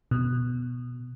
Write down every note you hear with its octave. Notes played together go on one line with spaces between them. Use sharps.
B2